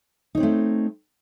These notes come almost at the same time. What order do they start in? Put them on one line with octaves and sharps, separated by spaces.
D#4 C#5 C4 A3